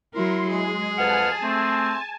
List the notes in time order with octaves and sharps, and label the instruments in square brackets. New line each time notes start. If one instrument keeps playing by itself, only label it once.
[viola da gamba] F#3 A#4 [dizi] E4 [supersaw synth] C6
[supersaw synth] G#3 [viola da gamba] G#4
[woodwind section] F2 F#5 F6 [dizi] B4 [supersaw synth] G#5 A5
[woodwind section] A3 C4 [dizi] C6